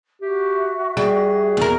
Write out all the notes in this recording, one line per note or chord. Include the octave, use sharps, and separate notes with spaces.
F#4 G4 E5
G3 G#4
E2 A#4